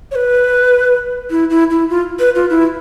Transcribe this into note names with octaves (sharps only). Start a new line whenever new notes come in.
C#5
B4
E4
E4
E4
F4
B4
F4
E4